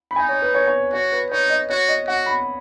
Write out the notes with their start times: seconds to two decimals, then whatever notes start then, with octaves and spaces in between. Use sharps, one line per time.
0.11 B5
0.16 D#4 G#5
0.29 C#5
0.42 B4
0.54 C#5
0.67 C#5
0.92 F#4 C#5
1.12 B4
1.30 D#4 C#5
1.50 D#5
1.69 F#4 C#5
1.88 D#5
2.07 F#4 F#5
2.26 B5